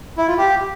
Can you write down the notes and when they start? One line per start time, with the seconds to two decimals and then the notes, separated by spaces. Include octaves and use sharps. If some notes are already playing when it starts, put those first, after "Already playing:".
0.18 E4
0.28 F4
0.38 G4